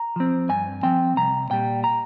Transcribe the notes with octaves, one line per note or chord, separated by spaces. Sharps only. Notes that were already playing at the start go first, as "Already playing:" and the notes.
Already playing: A#5
F3 C4
G2 G#5
F3 C4 G5
C2 A#5
A#2 G3 G5
A#5